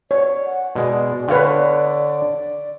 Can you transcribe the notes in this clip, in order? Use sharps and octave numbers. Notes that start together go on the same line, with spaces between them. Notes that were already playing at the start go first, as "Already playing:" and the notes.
C#5 D5
F#5
B2 G#3 D5
D3 B4 C#5 F5 G5